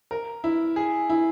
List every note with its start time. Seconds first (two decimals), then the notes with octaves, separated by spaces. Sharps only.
0.11 A#4
0.44 E4
0.76 G#4
1.10 E4